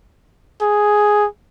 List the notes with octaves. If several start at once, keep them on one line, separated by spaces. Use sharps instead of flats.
G#4